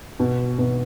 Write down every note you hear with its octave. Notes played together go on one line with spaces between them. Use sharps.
B2
B2